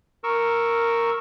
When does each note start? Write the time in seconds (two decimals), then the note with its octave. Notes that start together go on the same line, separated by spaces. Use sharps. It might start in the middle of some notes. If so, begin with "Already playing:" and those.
0.24 A#4 C#6 E6